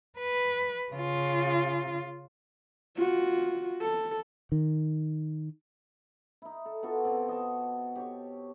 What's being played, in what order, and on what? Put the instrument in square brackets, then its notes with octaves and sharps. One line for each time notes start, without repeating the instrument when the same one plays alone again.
[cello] B4
C#3 F4
[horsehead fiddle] F4 F#4
A4
[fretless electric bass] D#3
[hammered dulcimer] D#4 E4
A4
B3 F4 F#4 A4
B2 C4 D5
D#5 F#5 A5 C#6
G4 C#5 C#6